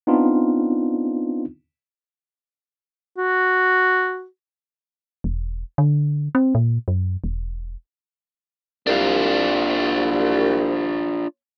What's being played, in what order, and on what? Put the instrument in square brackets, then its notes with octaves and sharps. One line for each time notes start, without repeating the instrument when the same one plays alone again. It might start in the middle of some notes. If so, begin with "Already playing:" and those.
[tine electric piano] B3 C4 D4 D#4 F4
[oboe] F#4
[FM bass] E1
D3
C4
A#2
F#2
E1
[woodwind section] C2 [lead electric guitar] D4 F4